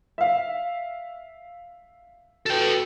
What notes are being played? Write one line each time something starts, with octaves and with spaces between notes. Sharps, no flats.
E5 F5
F#4 A4 B4 G5